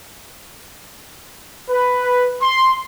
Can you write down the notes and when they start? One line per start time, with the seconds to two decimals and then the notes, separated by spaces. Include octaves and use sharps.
1.69 B4
2.42 C6